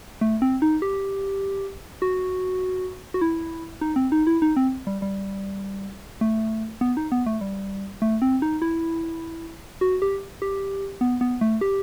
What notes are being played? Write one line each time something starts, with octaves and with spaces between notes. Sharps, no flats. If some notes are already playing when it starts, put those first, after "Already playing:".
A3
C4
D#4
G4
F#4
F#4
E4
D#4
C4
D#4
E4
D#4
C4
G3
G3
A3
B3
D#4
B3
A3
G3
A3
C4
D#4
E4
F#4
G4
G4
B3
B3
A3
G4